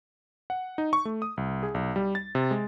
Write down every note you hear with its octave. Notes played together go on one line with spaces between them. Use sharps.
F#5
D#4
C#6
A3
D#6
C2
G#4
B1
G3
A6
C3
G#3